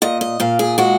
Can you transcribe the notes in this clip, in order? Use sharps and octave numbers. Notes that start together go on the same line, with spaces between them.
A#2 D#5
D#5
A#2 F5
G#4
G#3 F#4